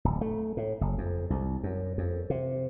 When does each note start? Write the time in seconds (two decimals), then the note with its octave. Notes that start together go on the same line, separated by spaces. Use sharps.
0.05 D1
0.21 A3
0.57 A2
0.81 F#1
0.98 F2
1.30 C2
1.63 F#2
1.98 F2
2.30 C3